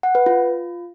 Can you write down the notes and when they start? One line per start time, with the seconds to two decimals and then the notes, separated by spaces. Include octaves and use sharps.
0.03 F#5
0.15 B4
0.26 F4